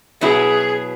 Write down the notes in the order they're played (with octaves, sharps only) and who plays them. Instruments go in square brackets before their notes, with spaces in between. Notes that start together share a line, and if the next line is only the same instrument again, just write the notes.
[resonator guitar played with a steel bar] B2 F#3 B3 E4 [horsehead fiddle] G#4